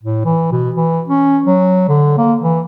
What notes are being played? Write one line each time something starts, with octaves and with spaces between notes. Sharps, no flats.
A2
E3
B2
E3
C#4
F#3
D3
A#3
E3